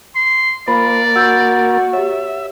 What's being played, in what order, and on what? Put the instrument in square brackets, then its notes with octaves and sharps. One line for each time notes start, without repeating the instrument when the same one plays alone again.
[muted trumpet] C6
[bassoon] F3 [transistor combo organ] A#3 A#4 [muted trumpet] D5 [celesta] B5
[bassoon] F#4 [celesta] E6 G6
[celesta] G4 C#5 [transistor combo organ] E5